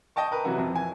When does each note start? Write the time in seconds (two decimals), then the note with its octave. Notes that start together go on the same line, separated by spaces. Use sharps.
0.16 D#5 G5 A5 C#6
0.32 A#4 B4
0.45 C3 E3 F#3 E4 F#4
0.58 F2 B2
0.76 G#5